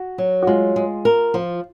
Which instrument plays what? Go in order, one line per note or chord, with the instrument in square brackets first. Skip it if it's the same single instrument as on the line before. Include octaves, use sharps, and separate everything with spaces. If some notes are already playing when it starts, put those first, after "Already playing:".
Already playing: [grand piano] F#4
[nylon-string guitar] F#3
[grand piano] F#4
[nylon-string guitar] G#3 [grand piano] F4
[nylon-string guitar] G#3
A#4
[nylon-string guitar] F3 [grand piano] F4